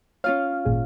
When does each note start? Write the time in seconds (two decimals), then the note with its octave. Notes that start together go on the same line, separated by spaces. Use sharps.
0.24 C#4 F4 C#5 F5
0.65 G#1 A#2 G#4